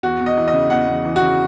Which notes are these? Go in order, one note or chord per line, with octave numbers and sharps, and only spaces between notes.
E2 F#4
E2
D#5
E3
D#5
C#3
E2 F#5
E2
E3
F#4
C#3